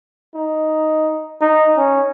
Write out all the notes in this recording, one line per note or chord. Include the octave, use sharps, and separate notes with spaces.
D#4
D#4
C#4